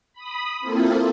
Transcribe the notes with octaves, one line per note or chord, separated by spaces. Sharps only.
B5 D#6
A#3 C4 E4 F4 A4